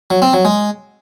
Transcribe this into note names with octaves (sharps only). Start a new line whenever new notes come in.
F#3
C4
F#3
G#3